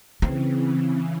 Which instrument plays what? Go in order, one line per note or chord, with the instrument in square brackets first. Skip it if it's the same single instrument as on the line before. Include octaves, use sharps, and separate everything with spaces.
[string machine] C#3 E3 [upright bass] C4